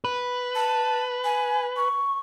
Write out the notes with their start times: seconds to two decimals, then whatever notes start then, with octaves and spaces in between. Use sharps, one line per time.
0.04 B4
0.55 A5
1.24 G#5
1.77 C#6